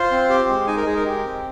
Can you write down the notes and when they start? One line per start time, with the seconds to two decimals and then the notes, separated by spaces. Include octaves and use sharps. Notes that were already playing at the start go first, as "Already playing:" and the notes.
Already playing: F4 C5
0.11 C4
0.30 G4
0.49 G#3
0.67 D#4 G#5
0.77 A#4
0.86 G#3 G#4
0.96 A#4
1.05 G4
1.24 C4